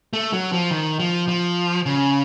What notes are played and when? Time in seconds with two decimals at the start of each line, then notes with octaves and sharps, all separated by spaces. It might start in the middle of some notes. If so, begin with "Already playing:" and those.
0.13 A3
0.33 F#3
0.52 F3
0.71 D#3
1.00 F3
1.28 F3
1.86 C#3